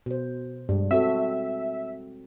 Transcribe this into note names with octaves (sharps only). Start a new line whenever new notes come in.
B2 C5
G2 G3 G#3
C4 F#4 A4 E5